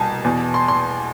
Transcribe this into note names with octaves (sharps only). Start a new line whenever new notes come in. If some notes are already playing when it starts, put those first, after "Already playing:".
Already playing: C2 B2 G#5 A5
E2 B2
C6
C6